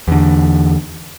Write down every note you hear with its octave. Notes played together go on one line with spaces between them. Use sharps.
E2 D3